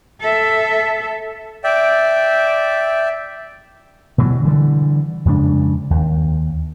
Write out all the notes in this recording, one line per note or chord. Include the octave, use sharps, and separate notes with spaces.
A4 E5
D5 E5 G5
B2 E3 F#3 G3
D3 E3 G3
F2 C#3 G#3 D4
D#2